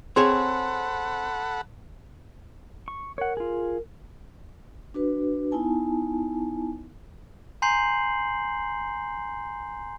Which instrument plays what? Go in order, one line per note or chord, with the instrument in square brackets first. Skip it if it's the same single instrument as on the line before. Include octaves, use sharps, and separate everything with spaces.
[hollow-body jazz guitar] C4 G#4 C#5 [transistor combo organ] A4 F#5 B5 [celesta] C6
[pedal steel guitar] C#6
[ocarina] A#4 [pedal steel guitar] C#5 F#5
[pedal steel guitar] F4 G#4
[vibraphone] D4 F#4 B4
B3 D#4 E4 G#5 A5
[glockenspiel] G#5 A#5 C6 G6 C7 F#7